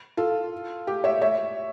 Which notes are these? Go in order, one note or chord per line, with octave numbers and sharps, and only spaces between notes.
F4 A4
G4
C#5 E5
C#5 E5